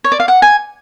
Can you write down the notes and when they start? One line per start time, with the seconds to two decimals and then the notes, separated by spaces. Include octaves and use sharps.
0.04 C#5
0.12 D5
0.20 F5
0.28 F#5
0.42 G#5